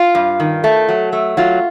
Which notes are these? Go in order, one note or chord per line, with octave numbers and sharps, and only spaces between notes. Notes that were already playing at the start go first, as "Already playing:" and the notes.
Already playing: F4
G2
D#3
A3
F#3
A3
F#3 F4